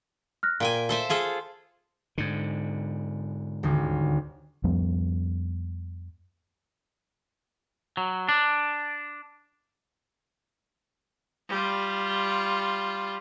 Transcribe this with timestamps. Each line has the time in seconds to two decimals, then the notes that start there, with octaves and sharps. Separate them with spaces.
0.43 F6 F#6 A#6
0.60 A#2 F5 G5 G#5
0.89 A4 C5 E5
1.10 F4 G#4 A4
2.18 G#2 D3
3.63 D#1 D2
4.64 F2 F3 G3 B3
7.97 F#3
8.29 D4
11.49 G3 F4